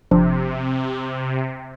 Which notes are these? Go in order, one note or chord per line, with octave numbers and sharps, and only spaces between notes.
G1 C3 F3 D4